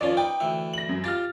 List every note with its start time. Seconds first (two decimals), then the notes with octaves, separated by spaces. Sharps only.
0.01 D#3 F3 C#4 F4 D5
0.17 D#4 B4 G5 D6
0.40 D2 E3 E5
0.73 A#6 F#7
0.89 F#2
1.04 F4 G4 F6 A6